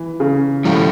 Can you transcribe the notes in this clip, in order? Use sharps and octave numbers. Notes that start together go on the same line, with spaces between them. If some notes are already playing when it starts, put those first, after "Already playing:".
Already playing: E3
C#3
A2 F3 G3